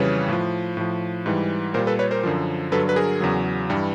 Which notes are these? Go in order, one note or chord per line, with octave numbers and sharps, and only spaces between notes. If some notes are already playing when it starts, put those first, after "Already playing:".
Already playing: F2 C#3 E3 G3 B4 C#5
A2 F3
A2 F3
G#2 E3 G3
A#2 G3 A#4 C5
A4 B4
B4 C#5
A#4 C5
F#2 D3 F3
G2 D3 F#3 A4 B4
B4
G#4 A#4
E2 C#3 F#3
G2 E3 G3